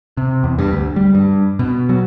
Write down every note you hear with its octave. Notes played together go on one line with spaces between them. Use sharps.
C3
E2
G2
D2
G3
G2
B2
F#3